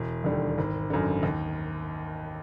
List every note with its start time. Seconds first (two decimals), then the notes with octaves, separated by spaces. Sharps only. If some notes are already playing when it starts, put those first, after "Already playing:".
Already playing: E1
0.24 D#2 D3 G3
0.58 G#1
0.90 F#2 D3
1.23 D#2